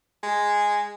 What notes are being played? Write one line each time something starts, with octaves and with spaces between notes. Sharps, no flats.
G#3